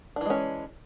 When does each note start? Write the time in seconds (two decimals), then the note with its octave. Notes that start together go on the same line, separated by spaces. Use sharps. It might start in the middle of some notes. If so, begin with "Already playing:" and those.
0.16 D4
0.21 E3
0.26 G#3
0.30 C#4